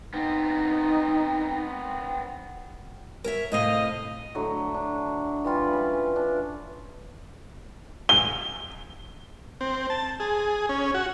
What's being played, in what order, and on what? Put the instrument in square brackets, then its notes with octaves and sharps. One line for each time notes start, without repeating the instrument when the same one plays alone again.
[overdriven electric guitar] B3 C4 [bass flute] D#4
[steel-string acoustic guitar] A#4 C#5 E5
[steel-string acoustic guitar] A2 C3 F5 [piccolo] D#5
[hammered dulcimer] A2 D3 F#3
D4
E3 G3 F4 B5
C#4
D4
[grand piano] G7
[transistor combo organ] C4
A5
G#4
C#4
F#4